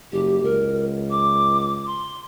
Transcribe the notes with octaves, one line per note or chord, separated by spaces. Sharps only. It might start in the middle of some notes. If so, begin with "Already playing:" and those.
F#1 G4
C#2 A#4
D6
C6